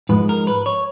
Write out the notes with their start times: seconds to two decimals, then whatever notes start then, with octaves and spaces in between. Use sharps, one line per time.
0.09 G#2 F3 G#3 B4
0.29 A#4
0.47 B4
0.66 C#5